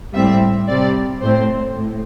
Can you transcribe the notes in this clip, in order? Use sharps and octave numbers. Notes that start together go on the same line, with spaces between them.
A2 G3 C4 E5
C3 G3 C4 D5
A2 A3 C4 C5
A2